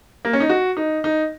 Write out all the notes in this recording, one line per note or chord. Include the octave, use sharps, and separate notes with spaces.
A#3
C#4
D#4
F#4
D#4
D#4